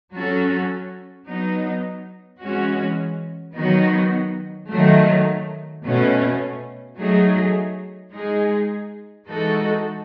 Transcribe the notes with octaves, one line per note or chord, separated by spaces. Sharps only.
F#3 C#4 F#4 A4
F#3 B3 D#4
E3 G#3 C#4 F#4
D#3 F#3 B3 D#4 F#4
D#3 F#3 A3
B2 A3 C#4
F#3 A3 D#4 G#4
G#3 D#4 G#4
E3 G#3 D#4 F#4 A4